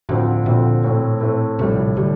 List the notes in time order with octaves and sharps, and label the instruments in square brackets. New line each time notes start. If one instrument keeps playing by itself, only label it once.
[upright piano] D2 D3 F3 C4 [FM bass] A2
[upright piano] D2 D3 F3 C4 [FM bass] A#2
[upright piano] A2 A3 C4
A2 A3 C4
[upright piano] A#1 A2 G3 [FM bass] C3
[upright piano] A2 G3 [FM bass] D3